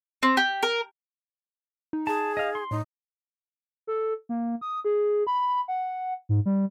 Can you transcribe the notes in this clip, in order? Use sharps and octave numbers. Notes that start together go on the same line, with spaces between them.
C4
G4
A#4
D#4
G#4 A5
D#5 F5
C6
A2 D#4
A4
A#3
D#6
G#4
B5
F#5
G#2
G3